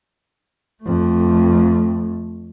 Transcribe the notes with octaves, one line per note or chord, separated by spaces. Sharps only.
F2 A3